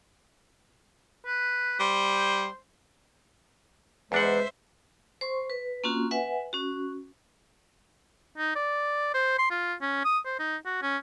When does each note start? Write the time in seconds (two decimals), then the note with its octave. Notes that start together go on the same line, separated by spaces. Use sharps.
1.26 B4
1.80 G3 C5
4.12 E2 G#3 D4 B4 C5 E5 F#5
5.21 C5 C6 C#6
5.50 B4
5.84 A#3 C4 C#4 F4 F#4
6.11 B4 E5 F#5 G#5
6.53 C#4 F#4
8.38 D#4
8.56 D5
9.14 C5
9.38 C6
9.51 F4
9.82 C#4
10.05 D#6
10.25 C5
10.39 D#4
10.65 F#4
10.82 C#4